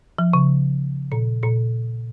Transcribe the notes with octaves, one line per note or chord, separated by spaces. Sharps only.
F3
C#3
A#2
A#2